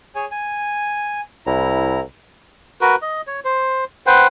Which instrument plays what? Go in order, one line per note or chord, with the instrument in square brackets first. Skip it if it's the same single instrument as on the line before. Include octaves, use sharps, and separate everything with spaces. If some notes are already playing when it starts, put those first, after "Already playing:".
[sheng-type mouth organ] G#4 C#5 G#5
G#5
[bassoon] C2 [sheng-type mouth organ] E4 A#5
[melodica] F#4 A#4 B4
D#5
C#5
C5
B4 C5 F#5 G5